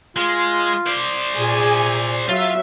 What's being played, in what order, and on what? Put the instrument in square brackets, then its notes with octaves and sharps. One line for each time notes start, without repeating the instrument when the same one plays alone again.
[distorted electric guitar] G#3 [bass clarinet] F4
[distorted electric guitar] C5 D5
[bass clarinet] A#2 [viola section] G#4 G#5
[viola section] F#3 E5 [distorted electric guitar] F4